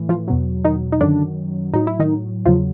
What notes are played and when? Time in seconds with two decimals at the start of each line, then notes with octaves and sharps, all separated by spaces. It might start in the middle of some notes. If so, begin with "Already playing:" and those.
Already playing: A2 E3
0.09 F3 F4
0.28 E2 B2 F#3
0.64 D#3 D#4
0.92 D#4
1.01 F#2 D3 D#3 F#3 D4
1.73 A2 F#3 D#4
1.87 E4
2.00 D#3 D#4
2.46 E2 C#3 F3 F#3 F4